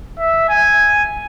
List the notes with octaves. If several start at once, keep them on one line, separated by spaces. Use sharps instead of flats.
E5
G#5